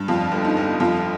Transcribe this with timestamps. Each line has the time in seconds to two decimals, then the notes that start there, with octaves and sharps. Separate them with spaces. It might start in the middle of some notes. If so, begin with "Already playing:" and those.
Already playing: G2
0.08 F2 F4
0.32 G1
0.45 D#4
0.57 G1
0.80 F2 F4